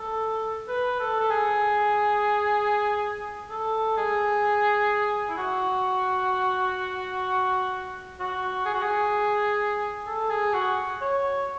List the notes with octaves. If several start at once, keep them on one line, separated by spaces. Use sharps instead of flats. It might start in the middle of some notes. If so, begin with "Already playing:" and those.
Already playing: A4
B4
A4
A4
G#4
A4
G#4
E4
F#4
F#4
G#4
F#4
G#4
A4
G#4
F#4
C#5